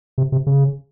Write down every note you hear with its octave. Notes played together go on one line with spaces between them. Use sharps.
C3
C3
C#3